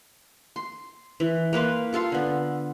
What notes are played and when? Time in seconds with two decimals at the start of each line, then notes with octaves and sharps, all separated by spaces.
0.56 C6
1.20 E3
1.53 A#3 B4 F5 C6
1.93 F4 A4 F5 C6
2.12 D3 B3